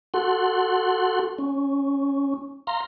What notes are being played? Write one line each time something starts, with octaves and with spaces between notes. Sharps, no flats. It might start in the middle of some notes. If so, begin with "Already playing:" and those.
F#4 A4 F#5 C6
C#4
F5 A#5 C6